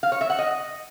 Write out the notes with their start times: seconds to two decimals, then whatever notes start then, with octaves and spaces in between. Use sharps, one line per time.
0.03 F5
0.12 C#5
0.21 E5
0.30 F#5
0.39 D#5